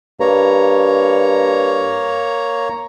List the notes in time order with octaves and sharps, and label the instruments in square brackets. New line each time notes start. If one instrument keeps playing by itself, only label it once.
[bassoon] G2 [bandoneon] A#3 C#5 A#5